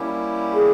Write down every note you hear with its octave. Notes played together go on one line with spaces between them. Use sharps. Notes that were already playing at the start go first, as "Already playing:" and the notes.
Already playing: G3 A#3 C#4 E4 G4
G#4